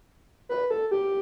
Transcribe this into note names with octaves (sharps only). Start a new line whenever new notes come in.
B4
A4
G4